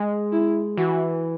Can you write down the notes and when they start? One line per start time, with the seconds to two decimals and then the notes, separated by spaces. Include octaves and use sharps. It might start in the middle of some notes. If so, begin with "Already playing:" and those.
Already playing: G#3
0.32 E4
0.77 E3 F#4